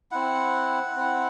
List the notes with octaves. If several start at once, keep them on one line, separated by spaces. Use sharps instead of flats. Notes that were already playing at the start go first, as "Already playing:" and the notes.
C4 E4 F#5
C4 E4